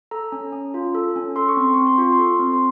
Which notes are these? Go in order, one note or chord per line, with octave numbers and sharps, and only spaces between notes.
A4 A#5
C#4
C#4
F4
A4
C#4
A4 C6
C#6
C4 C6
C4 C#6
C6
F4 C#6
C6
A4
C4
C6